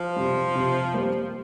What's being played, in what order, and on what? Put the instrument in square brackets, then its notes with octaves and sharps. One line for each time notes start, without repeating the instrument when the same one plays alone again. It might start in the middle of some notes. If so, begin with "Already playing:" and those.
Already playing: [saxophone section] F3
[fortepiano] C3 G3
C3
G3 A#3 G4 C5